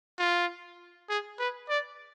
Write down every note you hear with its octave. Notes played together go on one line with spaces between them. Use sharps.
F4
G#4
B4
D5